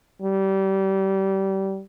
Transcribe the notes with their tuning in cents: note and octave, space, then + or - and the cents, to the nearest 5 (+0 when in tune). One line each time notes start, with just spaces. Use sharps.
G3 -25